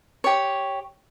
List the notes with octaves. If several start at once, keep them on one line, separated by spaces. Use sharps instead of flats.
G4 C#5